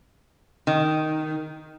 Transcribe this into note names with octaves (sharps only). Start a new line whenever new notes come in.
D#3